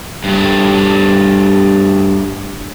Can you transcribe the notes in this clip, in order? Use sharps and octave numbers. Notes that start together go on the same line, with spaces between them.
G2 A3